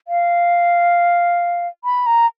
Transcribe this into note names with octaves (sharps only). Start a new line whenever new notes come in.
F5
B5
A#5